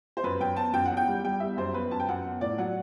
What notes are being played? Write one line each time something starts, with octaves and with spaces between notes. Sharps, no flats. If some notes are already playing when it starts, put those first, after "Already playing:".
C5
F#2 B4
F#2 G5
B3 A5
F#2 G5
F#5
E2
G5
G3
G3 G5
E2 E5
F#2 C5
B3 B4
F#2 A5
G5
F#2 F#5
B3
A2 D5
F#3 F#5